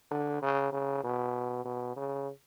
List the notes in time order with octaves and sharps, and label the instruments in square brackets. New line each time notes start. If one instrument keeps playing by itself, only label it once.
[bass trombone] D3
C#3
C#3
B2
B2
C#3